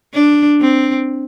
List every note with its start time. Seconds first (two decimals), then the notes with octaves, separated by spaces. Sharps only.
0.14 D4
0.61 C4